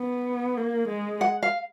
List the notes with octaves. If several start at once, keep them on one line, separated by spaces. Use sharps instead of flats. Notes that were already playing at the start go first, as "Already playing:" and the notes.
Already playing: B3
A#3
G#3
F#5
F5